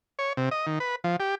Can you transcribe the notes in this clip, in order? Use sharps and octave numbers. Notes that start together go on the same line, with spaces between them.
C#5
C3
D#5
D#3
B4
F3
G4